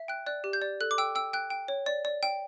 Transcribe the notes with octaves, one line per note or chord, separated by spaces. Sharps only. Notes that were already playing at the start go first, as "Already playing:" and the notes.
Already playing: E5
G5 F#6
D5 F#6
G4
G6
D5
A4 F#6
D6
G5 E6
G5 E6
G5 F#6
G5
C#5
D5
D5
G5